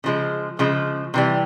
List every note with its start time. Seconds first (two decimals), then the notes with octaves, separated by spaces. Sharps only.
0.04 C#3 F3 G#3
0.59 C#3 F3 G#3
1.14 C3 E3 G3